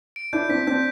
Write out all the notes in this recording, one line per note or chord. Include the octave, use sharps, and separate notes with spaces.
D7
D4 E4 G6
C4 D4 B6
C4 D4 G6